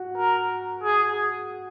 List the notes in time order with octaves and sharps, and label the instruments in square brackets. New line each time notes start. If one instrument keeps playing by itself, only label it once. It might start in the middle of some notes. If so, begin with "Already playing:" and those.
Already playing: [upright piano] F#4
[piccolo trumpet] A#4
G#4